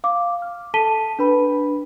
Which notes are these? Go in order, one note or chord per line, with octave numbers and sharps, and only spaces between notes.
F5 D6
F6
A4 A5 B6 D#7 G7
D4 B4 B5